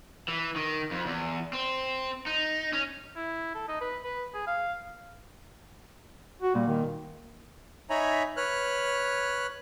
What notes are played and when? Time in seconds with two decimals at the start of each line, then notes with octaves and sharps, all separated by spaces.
0.28 E3
0.56 D#3
0.91 F2
1.06 E2
1.53 C4
2.27 D#4
2.73 C#4
3.16 E4
3.55 A4
3.68 D#4
3.81 B4
4.04 B4
4.35 G#4
4.47 F5
6.42 F#4
6.55 A#2 G3
6.67 D#3
7.90 D#4 C#5 E5 G#5 A#5 B5
8.37 B4 C#5 F6 F#6